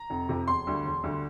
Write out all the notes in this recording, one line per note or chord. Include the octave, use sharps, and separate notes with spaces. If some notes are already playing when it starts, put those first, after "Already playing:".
Already playing: A#5
F1
F2 C3
E1 C6
D2 D3 G3
E1
D2 D3 G3